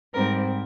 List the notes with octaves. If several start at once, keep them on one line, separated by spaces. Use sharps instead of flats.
G#2 G3 C4 A#4